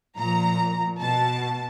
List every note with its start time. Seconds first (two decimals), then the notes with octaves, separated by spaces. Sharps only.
0.18 A#2 F3 A#5
1.01 B2 A5